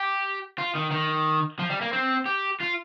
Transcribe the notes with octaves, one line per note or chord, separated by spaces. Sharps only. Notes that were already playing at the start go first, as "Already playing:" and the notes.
Already playing: G4
F4
D#3
D#3
F3
G3
A#3
C4
G4
F4